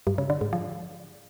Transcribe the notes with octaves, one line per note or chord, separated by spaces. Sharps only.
G2
C#3
D3
G#2
F3